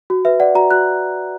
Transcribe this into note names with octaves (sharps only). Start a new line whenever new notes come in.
F#4
B4 E5
D5 F#5
F#4 A#5
F#4 F#6